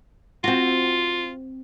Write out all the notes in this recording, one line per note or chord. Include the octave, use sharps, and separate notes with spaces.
C4 F4 F#4